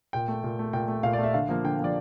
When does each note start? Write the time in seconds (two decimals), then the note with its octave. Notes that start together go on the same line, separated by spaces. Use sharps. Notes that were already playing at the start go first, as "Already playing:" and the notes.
0.13 A#2 G5
0.28 A3
0.44 A#2
0.59 A3
0.73 A#2 G5
0.88 A3
1.03 A#2 F5
1.13 D5
1.18 A3
1.24 E5
1.34 D3 F5
1.49 F3 A#3
1.64 D3 G5
1.79 F3 A#3 D5